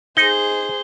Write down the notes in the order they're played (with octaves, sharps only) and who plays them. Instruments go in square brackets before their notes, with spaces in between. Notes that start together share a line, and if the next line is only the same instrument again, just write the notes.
[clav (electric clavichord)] D#4 [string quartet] G#4 C5 [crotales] G7